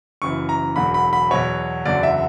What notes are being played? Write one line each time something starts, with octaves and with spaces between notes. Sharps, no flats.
F#1 F#2 E3 C#6
A#5
E1 E2 D3 F#3 B5
B5
B5
E2 B2 F#3 C#5
F#1 E2 D3 F#3 D5
E5